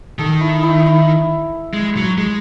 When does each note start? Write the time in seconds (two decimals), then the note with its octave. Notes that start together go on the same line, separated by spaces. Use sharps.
0.19 D#3 A4
0.41 E4
0.63 E4
0.86 E4
1.74 G#3
1.97 F#3
2.18 G#3